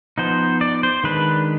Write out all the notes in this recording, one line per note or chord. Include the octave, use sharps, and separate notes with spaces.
F3 B3 D#4 C5
D5
C5
D#3 G#3 D4 B4